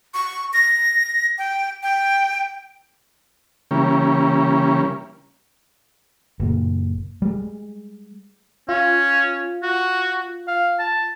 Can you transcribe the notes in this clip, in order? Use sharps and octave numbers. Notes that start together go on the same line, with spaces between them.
C#6
A#6
G5
G5
C#3 E3 G3 A#3 C#4
F#1 A#2
G3 G#3
C#4 F4
F#4
F5
A5